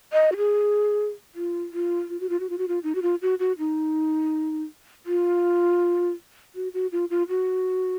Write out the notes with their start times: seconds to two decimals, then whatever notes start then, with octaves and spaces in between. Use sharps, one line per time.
0.13 D#5
0.32 F#4
0.37 G#4
1.35 F4
1.73 F4
2.10 F4
2.20 F#4
2.29 F4
2.40 F#4
2.50 F4
2.58 F#4
2.68 F4
2.84 D#4
2.95 F#4
3.02 F4
3.22 F#4
3.39 F#4
3.59 D#4
5.06 F4
6.55 F#4
6.74 F#4
6.92 F4
7.10 F4
7.29 F#4